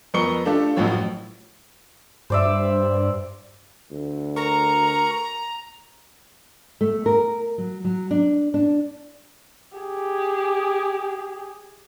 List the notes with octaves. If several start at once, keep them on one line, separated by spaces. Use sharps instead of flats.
F2 B3 A#4 C#6 C#7 G7
A3 D4 F4 G4 A4
A1 F#2 A2 F3 C#5
G2 C5 D5 E5
D2
A#4 A#5 C#6
A3
A#4
F#3
F#3
D4
D4
G4 G#4